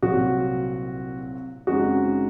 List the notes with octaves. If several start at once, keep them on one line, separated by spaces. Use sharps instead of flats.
C2 A#2 F#3 C4 F#4
F#2 C#3 G#3 C4 D#4 F#4